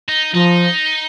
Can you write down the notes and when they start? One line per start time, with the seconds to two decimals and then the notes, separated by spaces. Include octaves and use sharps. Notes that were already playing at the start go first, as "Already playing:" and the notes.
0.09 D#4
0.34 F3 D#4